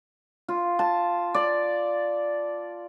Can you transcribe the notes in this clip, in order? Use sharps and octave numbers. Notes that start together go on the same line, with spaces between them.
F4
A5
D5